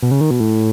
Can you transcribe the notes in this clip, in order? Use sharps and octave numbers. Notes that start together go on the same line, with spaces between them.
B2
C#3
D#3
B2
A2